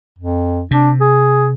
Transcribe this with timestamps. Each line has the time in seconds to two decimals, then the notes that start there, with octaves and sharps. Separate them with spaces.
0.18 F2
0.71 C3 D4
1.01 G#4